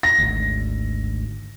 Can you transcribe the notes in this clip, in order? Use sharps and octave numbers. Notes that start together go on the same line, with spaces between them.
A#6
G#1 D2